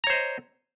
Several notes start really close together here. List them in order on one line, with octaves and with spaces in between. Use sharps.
A#5 C#5 C5 D#5